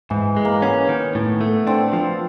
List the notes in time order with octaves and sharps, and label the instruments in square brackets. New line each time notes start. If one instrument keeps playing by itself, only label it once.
[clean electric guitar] G#2 [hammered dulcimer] E3
[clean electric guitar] G#3
[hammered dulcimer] A#3
[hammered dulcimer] B3 [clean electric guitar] C#4
[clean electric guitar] D#3
A2
A3
[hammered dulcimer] C4 [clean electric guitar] D4
[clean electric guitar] F3